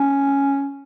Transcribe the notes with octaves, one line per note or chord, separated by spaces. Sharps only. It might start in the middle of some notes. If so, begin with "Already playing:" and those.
Already playing: C#4